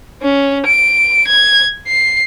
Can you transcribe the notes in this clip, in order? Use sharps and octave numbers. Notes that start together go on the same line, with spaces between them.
C#4
D7
G#6
C7